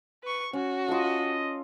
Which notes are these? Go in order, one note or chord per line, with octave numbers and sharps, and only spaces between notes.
B4 C#6
C#4 F#4
F4 A4 D#5